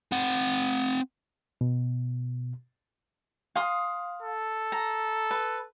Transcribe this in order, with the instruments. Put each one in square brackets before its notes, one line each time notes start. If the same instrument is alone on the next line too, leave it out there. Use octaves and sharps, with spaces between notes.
[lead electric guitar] C4 F#5
[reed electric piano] B2
[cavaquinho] F5 C6 D#6
[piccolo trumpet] A4
[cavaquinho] A#5
B4